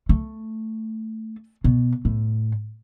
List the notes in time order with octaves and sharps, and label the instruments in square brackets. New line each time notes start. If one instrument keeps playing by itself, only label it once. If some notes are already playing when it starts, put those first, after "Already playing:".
[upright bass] A3
B2
A2